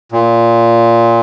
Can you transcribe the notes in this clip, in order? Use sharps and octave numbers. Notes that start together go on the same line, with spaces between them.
A#2